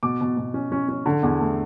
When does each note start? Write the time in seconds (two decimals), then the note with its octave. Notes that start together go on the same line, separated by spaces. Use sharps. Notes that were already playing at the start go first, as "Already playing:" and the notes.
0.03 B2 D6
0.21 B2
0.37 B2
0.54 C#4
0.72 C#4
0.89 C#4
1.06 D3
1.23 E2
1.40 A3